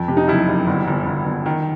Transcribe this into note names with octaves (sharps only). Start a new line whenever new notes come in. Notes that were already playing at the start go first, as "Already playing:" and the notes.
Already playing: F2
C3
D#4
F#1 E4
F#1
G1
G1
G1
G1
D#3